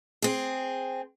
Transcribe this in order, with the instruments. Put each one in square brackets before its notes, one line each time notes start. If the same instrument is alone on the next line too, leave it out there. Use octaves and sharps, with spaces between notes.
[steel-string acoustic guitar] C4 G#4